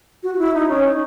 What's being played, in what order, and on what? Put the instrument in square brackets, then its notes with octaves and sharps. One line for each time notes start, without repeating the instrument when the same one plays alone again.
[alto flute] F#4
F#4
E4
D#4
C#4
D#4